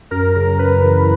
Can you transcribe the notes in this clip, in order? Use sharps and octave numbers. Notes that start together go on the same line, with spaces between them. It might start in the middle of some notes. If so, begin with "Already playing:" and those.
F#2 A#4
C#3 A#4
F#2 B4
E3